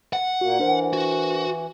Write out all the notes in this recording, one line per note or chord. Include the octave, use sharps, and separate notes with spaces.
F#5
A#2 A#3 F#4
E3 D4 A#4 C5
F#4